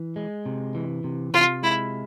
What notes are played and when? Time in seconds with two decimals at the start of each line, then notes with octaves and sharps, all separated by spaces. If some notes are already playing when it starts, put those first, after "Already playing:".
Already playing: E3
0.16 G#3
0.46 C3
0.75 E3
1.04 C3
1.34 C3 F4
1.63 G#3 E4